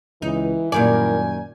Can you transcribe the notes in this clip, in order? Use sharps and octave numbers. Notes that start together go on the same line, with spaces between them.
C#2 E3 D#4
F#2 A#2 D#3 G3 E4 A#4 D5 G#5